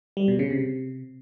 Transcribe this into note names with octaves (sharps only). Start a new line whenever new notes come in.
G3
B2
C#3
C3